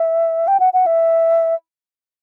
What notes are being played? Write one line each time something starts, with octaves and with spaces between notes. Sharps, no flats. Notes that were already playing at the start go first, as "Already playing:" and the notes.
Already playing: E5
G5
F#5
F#5
E5